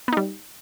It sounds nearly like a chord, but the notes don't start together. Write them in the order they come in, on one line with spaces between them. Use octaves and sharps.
B3 D#4 G3